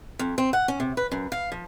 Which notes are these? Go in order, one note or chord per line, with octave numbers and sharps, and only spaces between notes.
F2
C4
F#5
C#4
C3
B4
F#2
F5
F3